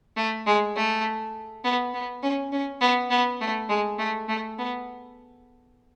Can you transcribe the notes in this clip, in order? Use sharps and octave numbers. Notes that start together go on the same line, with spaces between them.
A3
G#3
A3
B3
B3
C#4
C#4
B3
B3
A3
G#3
A3
A3
B3